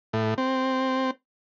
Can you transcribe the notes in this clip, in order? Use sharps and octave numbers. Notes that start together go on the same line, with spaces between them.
A2
C4